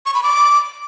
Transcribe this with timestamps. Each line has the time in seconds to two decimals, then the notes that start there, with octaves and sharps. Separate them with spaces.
0.06 C#6
0.14 B5
0.23 D6